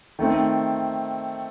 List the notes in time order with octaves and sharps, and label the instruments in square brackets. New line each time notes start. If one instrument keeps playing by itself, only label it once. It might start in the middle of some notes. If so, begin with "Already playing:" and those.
[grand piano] D#3 A3 C4